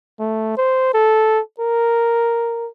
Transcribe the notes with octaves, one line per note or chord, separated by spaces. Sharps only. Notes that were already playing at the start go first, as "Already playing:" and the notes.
A3
C5
A4
A#4